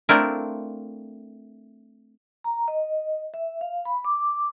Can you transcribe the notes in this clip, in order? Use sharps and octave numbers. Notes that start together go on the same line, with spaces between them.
A3 C4 D4 E4 F4 A#4
A#5
D#5
E5
F5
B5
D6